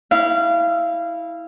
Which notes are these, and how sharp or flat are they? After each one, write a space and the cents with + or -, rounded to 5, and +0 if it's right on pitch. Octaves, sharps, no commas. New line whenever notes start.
E4 -15 F5 -25